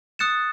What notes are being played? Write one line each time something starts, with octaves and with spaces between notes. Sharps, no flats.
D#6 F#6 A6 C#7 E7